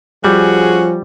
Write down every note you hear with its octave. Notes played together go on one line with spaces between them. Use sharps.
F3 G3 C#4 F#4 G#4